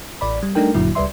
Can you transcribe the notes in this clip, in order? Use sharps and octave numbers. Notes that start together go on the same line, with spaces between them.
A1 D5 B5
G3
G3 A3 D4 D#4 A#4 G5
G1 F#2 A#2 D3 F#3 E4
C#2 G3 B4 D5 E5 C6